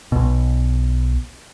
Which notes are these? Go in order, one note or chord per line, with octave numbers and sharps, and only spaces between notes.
B1 B2